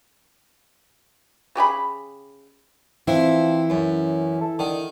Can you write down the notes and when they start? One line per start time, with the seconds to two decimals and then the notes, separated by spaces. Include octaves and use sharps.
1.55 C#3 G4 G#4 B5
3.07 E3 F3 C4 E4
3.70 F#2 C#4
4.41 A4
4.59 D3 D#3